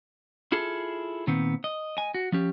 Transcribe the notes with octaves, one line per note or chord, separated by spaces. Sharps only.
E4 F4 G#4 A4
A#2 D#3 B3 C4
D#5
D#5 G#5
F#4
F3 C#4 G4